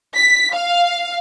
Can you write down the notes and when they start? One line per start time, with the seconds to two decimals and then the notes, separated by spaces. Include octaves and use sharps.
0.17 B6
0.54 F5